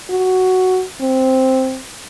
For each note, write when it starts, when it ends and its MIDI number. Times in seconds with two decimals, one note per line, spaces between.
0.10 0.83 66
1.01 1.79 60